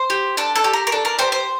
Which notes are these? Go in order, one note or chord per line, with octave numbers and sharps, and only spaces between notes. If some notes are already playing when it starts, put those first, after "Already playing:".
Already playing: C5
G4
D4 A4
A4
G4
A#4
A#4
D4 A4
A#4
G4 C5
C5